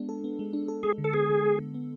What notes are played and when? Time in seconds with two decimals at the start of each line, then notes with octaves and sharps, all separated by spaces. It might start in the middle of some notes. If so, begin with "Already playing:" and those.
Already playing: G#3 B3 D4
0.09 A4
0.24 B3
0.39 G#3
0.53 D4
0.68 A4
0.83 G#3 G#4
0.98 D3
1.04 A4
1.14 B3 G#4
1.29 D3
1.44 G#3
1.59 D3
1.74 B3